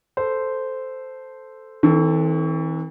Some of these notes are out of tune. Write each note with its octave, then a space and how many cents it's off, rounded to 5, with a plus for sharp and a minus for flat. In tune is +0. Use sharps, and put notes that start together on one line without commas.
A4 +0 C5 -10
E3 -45 C4 +0 A4 +0